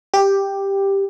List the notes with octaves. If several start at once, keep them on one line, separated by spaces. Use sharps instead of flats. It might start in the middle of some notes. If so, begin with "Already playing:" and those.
G4